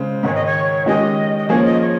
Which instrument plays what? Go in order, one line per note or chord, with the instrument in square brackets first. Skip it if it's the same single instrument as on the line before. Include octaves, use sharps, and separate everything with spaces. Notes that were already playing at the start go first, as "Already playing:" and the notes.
Already playing: [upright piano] C#3 G#3 C5
[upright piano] G#2 D#3 G#3 [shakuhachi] C#5
[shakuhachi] D#5
C#5
[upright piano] D#3 G#3 C#4 G4 [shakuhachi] D#5
[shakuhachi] D#5
[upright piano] F3 A#3 C#4 G#4 [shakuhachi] C#5
[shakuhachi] D#5
C#5